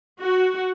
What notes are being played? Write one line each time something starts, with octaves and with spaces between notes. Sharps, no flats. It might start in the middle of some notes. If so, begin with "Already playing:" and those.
F#4